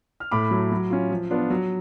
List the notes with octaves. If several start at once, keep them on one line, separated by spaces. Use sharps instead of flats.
F6
A2 B5 D6
F#3 A3
F#3
C#4 F4
F3
B3 D4 F4
F#3